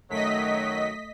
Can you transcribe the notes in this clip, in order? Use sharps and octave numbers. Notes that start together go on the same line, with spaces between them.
F#2 D#3 F#3 A3 D#5 B6